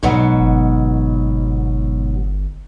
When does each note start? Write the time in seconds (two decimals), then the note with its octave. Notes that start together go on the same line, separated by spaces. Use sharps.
0.03 B1 G#2 B2 F#3
0.39 G1